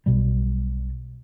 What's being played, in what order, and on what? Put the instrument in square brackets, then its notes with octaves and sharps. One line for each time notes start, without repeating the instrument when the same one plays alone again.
[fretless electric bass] B1 B2 G3